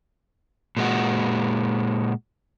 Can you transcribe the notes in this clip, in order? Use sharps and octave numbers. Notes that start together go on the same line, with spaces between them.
A#2 G#3 F#4